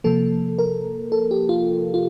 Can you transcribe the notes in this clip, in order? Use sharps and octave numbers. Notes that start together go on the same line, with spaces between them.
C3 F3 A#3 A4
A#4
A4
G4
F4
F4